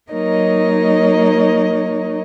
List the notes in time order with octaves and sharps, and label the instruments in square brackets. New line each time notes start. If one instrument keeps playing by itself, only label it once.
[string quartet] F#3 A#3 D#4 A#4 C#5 D#5